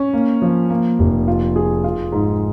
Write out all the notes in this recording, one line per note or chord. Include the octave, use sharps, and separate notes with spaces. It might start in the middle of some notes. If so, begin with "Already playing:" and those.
Already playing: C#4
A#3
F3
A#3
F1
F4
G#4
F4
G#2